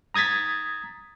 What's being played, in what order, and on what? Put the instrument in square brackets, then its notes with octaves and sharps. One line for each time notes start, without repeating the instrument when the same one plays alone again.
[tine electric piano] A#5 D#6 G#6 A6 B6